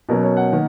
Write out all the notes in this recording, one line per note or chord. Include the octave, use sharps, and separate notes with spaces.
B2 F#3 C#4 A#4
C#5
F#5
D#3 A#3